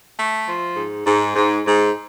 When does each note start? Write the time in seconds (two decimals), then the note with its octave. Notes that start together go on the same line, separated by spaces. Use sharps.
0.17 A3
0.47 F3
0.76 G#2
1.06 G#2
1.35 G#2
1.65 G#2